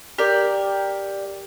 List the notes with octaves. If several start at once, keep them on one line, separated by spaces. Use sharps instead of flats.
G4 A#4 D5